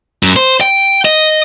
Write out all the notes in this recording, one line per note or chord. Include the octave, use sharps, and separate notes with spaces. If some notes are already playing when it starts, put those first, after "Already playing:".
F#2
C5
G5
D#5